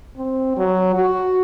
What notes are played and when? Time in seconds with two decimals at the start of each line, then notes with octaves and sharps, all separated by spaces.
0.17 C4
0.57 F#3
0.95 F#4